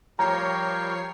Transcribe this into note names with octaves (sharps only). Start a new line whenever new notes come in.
F3 G3 A#4 C#5 G5 A#5 C7